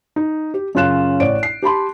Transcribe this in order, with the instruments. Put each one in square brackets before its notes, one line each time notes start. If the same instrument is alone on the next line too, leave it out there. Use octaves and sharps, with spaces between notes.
[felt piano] D#4
G4
F#2 C#3 F4 F#6 E7
A1 C#5 D5 D7
C7
G4 A5 B5 C6